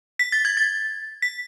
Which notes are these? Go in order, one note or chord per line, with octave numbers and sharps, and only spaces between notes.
B6
A6
G#6
A6
B6